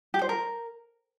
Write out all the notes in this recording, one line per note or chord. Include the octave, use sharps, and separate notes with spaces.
G4
C5
A#4